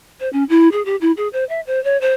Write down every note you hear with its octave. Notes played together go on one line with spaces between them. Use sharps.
C5
C#4
E4
G#4
G4
E4
G#4
C5
E5
C5
C#5
C5